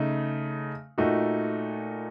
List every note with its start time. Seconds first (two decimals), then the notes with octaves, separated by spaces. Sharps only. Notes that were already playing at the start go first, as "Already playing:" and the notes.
Already playing: C#3 A3 D#4
0.98 A#2 A3 D#4 F#4